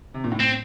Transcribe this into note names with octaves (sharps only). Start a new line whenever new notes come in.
C3
A#2
A2
C4